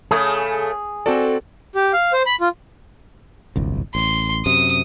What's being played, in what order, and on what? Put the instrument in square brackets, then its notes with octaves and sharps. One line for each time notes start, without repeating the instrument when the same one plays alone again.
[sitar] C#3 A3 [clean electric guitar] G#4
[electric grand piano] C4 F#4 D5 [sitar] A4
[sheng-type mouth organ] G4
F5
C5
B5
F4
[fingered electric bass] D1 G1 C2
[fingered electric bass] A1 [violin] C6
[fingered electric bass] F#2 C3 [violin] D#6